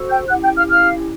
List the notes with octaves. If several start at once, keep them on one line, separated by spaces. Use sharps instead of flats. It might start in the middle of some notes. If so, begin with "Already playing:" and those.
Already playing: F#4 A4 C5
G5 G6
C#4 E4 G4 F#5 F#6
G5 G6
F5 F6
F5 F6